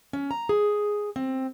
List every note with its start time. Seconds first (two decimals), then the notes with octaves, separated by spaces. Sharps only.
0.13 C#4
0.31 A#5
0.49 G#4
1.16 C4